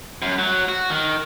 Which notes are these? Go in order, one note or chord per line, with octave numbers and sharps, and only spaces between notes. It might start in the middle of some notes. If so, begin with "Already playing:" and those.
F#2
F#3
F#4
D#3